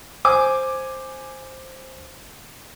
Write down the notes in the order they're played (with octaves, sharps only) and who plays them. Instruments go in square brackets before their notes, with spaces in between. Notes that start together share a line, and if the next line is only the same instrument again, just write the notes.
[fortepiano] C5 G#5 D6